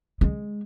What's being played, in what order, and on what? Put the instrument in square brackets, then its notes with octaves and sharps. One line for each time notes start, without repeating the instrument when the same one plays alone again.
[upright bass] G#3